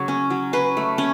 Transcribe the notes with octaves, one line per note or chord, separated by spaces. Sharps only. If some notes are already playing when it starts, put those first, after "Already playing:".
Already playing: C#3 F#3 C#5
C#4
F#3
C#4 B4
A3
C#4